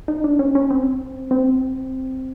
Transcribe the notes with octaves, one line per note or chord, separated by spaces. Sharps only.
D#4
D4
C#4
C#4
C4
C4